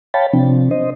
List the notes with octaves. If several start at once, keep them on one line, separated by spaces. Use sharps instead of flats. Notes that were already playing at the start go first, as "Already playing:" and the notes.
C#5 F5 G5 A5 B5 A6
C3 F3 C4 D4
C5 D#5